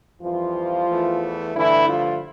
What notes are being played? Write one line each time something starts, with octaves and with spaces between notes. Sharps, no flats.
F2 E3 F3 G3 F4
E2 E3 A3
G2 D3 E3 A3 E4
F3 F4